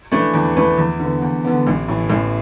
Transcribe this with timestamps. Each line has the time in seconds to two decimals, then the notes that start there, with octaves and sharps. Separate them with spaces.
0.12 E3 A3 D4 B4
0.34 E2
0.56 E3 A3 D4 B4
0.78 E2
1.00 D3 B3
1.22 E2
1.45 D3 B3
1.67 A1
1.88 A2 E3
2.10 A1